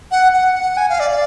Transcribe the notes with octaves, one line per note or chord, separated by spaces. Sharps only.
F#5
F#5
F#5
G#5
F5
D5
D5